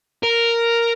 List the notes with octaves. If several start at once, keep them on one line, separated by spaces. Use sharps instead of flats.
A#4